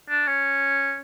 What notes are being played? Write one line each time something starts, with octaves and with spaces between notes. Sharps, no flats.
D4
C#4